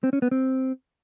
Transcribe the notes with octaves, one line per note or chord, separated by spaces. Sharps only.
C4
C#4
B3
C4